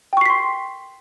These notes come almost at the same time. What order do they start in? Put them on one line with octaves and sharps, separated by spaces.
G5 C#6 C7 B6 C6